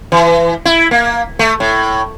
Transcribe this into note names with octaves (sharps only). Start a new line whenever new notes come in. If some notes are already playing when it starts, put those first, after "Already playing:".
E3
E4
A#3
A3
A2